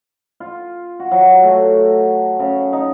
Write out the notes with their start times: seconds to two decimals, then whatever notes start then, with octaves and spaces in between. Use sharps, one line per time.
0.40 F4
1.00 F#4
1.12 F#3
1.43 A3
2.40 C#3
2.73 D#4